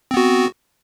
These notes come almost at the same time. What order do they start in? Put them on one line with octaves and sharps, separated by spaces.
C4 B3 F#4